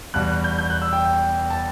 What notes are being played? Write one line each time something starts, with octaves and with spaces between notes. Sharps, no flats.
E2 B2 G3 F#6
F#6
G6
G6
F#6
E6
G5
G5
A5